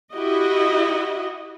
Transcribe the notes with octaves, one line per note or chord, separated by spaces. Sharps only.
E4 F#4 G4 D#5